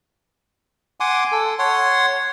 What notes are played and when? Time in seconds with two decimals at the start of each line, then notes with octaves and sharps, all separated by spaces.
1.00 F#5 G#5 C6 D6
1.32 A4
1.59 C#5 F#5 C6